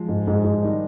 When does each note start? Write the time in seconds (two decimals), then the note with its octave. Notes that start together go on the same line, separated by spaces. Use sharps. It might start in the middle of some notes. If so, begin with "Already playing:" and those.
Already playing: F3 G#3
0.09 G#2
0.27 G#2
0.44 G#2
0.63 D#3 G3 D#4